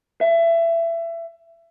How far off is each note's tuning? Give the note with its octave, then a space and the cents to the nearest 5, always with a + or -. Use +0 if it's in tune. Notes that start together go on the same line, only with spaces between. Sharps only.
E5 +25